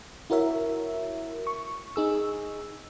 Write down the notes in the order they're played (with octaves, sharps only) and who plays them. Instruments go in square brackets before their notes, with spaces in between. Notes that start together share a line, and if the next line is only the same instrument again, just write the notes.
[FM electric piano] E4 F#4 A#4 C#5 E5
C#6
D#4 G#4 E6